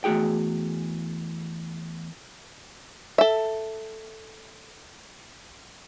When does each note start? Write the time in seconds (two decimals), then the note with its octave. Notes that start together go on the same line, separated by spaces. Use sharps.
0.04 E2 A3 A#3 F#4 G#4 G5
3.18 A4 E5